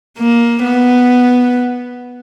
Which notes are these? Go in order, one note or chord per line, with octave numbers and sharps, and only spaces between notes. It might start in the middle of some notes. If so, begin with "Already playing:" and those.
A#3
B3